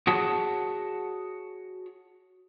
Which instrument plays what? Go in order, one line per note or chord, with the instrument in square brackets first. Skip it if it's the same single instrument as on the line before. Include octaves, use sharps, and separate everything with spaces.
[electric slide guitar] F#4 G#4 C#5 F#5 A5